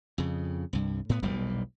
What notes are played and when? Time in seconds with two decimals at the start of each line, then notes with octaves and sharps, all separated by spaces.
0.18 F2 C#3
0.73 C2 G2
1.09 A2 B3
1.23 E1 B1 A#2 G3